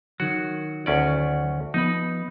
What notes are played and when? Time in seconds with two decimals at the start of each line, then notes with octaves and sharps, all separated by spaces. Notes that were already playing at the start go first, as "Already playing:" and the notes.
0.20 D#3 F#3 F#4
0.86 D2 C#4 D5
1.74 F3 B3 D#4 B5